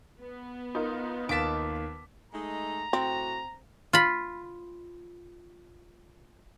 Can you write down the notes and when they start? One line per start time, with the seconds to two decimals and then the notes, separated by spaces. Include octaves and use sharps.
0.20 B3
0.75 D#4 F4 A#4
1.29 D#2 A#3 A5 D6 B6
2.32 G#3 A3 D#4 A#5
2.93 A2 C4 F#4
3.93 F4 B5